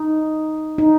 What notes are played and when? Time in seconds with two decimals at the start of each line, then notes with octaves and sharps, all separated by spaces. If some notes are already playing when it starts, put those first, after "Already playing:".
Already playing: D#4
0.78 D#4